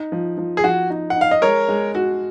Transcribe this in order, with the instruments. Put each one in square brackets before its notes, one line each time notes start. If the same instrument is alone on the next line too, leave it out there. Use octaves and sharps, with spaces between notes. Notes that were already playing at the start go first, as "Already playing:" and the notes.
Already playing: [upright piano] D#4
F3
F3
[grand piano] G#4
[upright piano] F3 [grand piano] F#4
[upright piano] D#4
[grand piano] F#5
[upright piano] D#4
[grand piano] F5
D#5
[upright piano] G#3 [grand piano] A#4 C#5
[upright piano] G#3
F#4